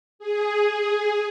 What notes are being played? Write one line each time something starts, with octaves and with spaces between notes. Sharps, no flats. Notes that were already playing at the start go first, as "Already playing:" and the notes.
G#4